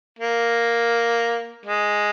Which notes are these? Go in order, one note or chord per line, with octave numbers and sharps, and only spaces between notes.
A#3
G#3